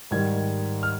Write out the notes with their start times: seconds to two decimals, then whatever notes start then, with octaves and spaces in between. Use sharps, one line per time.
0.11 G#2 D#3 G3 G#6
0.83 F6